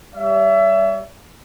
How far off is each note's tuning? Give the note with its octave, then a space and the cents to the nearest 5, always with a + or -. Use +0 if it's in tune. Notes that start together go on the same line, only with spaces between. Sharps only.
G3 +0 C#5 +45 E5 +20